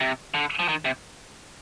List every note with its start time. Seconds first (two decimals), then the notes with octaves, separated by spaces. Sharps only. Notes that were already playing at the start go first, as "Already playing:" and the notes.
0.01 C3
0.34 D3
0.59 F3
0.69 D#3
0.85 C3